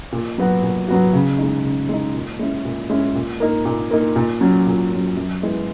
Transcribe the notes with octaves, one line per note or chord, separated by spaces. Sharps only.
A#2
F#3 B3 F#4
A#2
F#3 B3 F#4
C#3
G#3 D#4
C#3
G#3 D#4
A#2
G#3 C#4 E4
A#2
G#3 C#4 E4
A#2
A#3 D#4
A#2
A#3 D#4
A#2
F#3 C#4
A#2
F#3 C#4
F#2
E3 G#3 B3